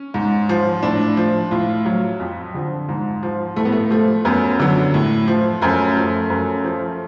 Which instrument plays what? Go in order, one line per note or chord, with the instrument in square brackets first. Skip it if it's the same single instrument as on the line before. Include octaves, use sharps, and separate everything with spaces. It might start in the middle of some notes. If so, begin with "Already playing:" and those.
Already playing: [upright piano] C#4
G#2
F3
A2 D4
F3
A2 F4
F#3
F2
D3 F3
G#2
F3
A2 A3
B3
A3
F3 A3
F#2 B3
D3 F#3
A2
F3
F#2 A3
F3
F#2
F3